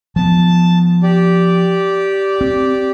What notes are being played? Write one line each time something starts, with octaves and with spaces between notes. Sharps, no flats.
F3 B3 A5
G4 D5
C4